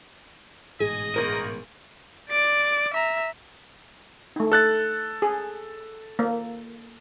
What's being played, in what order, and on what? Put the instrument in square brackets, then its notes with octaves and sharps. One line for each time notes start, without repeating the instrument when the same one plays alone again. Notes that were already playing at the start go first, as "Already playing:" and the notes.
[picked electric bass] A1 G#2 B2 [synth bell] G#4 [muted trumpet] D#5
[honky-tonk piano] G1 A#4 D#7
[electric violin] D5 D6
E5 A#5
[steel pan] A3 D#4
[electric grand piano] A4 F#6 A6
[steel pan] G#4
A#3